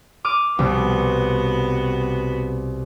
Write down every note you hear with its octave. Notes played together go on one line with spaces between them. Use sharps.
D6 F6 D#7
C2 B2 B3 F#4